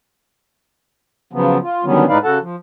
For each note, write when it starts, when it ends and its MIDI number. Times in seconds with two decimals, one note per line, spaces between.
1.33 1.58 49
1.33 1.58 53
1.33 1.58 54
1.33 1.58 59
1.62 1.85 65
1.85 2.05 50
1.85 2.05 51
1.85 2.05 54
1.85 2.05 55
1.85 2.05 59
1.85 2.05 61
2.09 2.18 45
2.09 2.18 56
2.09 2.18 63
2.09 2.18 71
2.09 2.18 74
2.09 2.18 77
2.24 2.38 49
2.24 2.38 66
2.24 2.38 69
2.24 2.38 78
2.24 2.38 81
2.41 2.56 53